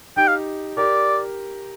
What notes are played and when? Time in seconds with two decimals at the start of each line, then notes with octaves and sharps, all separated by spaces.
0.17 D#4 G4 G5
0.27 F5
0.77 G4 A#4 D5